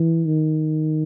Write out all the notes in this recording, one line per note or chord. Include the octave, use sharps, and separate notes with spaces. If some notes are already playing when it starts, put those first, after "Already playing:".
Already playing: E3
D#3